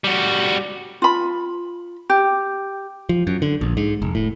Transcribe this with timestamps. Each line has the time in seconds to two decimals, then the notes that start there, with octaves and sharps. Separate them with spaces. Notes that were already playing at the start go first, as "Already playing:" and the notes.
0.04 G3 F#4
1.02 F4 B5
2.10 G4
3.09 F3
3.27 F#2
3.42 D3
3.61 A#1
3.77 G#2
4.02 F1
4.15 A2